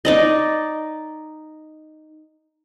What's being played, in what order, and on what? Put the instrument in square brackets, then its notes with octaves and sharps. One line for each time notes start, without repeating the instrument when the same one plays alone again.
[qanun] D#4 D5 D#5